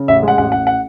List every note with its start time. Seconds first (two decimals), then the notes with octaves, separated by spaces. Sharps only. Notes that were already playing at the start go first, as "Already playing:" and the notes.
Already playing: C#3
0.08 A1 E5
0.23 G#3
0.28 F#5
0.38 A1 F#5
0.52 A1 F#5
0.67 F#5